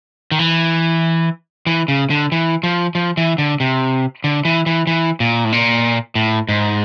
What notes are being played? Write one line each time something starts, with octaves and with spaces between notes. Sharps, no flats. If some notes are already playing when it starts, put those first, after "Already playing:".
D#3
E3
E3
C#3
D3
E3
F3
F3
E3
D3
C3
D3
E3
E3
E3
A#2
A2
A#2
A2
G#2